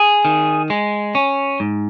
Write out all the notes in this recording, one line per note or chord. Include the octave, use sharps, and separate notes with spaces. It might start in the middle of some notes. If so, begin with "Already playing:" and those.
Already playing: G#4
D#3
G#3
C#4
G#2